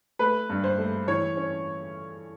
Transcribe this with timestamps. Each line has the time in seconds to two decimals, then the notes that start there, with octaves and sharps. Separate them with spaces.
0.19 A3 B4
0.50 G2
0.64 C5
0.78 A3
1.08 E3 C#5
1.37 C#4